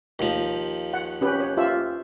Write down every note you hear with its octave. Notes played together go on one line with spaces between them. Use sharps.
D#2 F3
F#5
C#4 G4 B4
C#5
F4 G4 E5